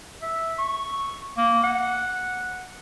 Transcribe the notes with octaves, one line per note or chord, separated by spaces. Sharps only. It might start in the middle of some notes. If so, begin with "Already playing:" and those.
E5
C#6
A#3
F#5